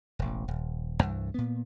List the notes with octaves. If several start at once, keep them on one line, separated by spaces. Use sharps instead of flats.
E1 A1
D#1
C2 G2 E3
A#2 B3